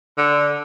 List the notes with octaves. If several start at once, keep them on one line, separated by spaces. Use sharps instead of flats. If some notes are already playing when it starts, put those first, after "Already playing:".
D3